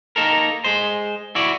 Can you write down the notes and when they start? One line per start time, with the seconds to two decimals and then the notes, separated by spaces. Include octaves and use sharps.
0.16 A#3 D#4 A4 A#4
0.64 G#3 C5
1.35 E4 F#4 D5